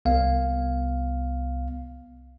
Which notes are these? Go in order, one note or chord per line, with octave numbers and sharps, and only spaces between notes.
C2 B3 F5